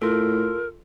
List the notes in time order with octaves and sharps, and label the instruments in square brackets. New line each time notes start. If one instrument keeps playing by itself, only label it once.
[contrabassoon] A2 [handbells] F4 A4 [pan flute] A#4